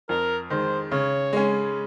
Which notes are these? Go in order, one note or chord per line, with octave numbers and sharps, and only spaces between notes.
F2 A#4
D#3 G#3 C5
C#3 C#5
G#3 C#4